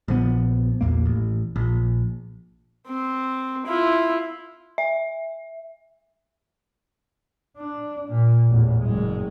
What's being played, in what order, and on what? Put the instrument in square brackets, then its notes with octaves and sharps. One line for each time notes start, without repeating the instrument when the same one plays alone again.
[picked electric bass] A#1 F3 B3
A#1 E2 A#3
A1
A#1
[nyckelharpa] C4
E4 F4
[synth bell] E5
[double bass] D4
A#2
A1 E2
F#1 G#3